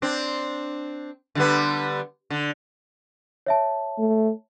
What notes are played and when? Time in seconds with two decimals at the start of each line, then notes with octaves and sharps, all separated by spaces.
0.02 C4 D4
1.35 D3 G3 B3
2.30 D3
3.46 C#5 E5 A5
3.99 A3